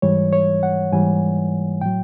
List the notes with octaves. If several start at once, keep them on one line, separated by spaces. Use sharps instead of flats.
G#2 E3 G3 C#5
C#5
F#5
G#2 E3 G3 G#5
A2 F#3 G5